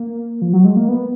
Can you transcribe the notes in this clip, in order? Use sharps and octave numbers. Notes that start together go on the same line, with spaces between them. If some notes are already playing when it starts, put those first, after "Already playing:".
Already playing: A#3
F3
F#3
G#3
A#3
B3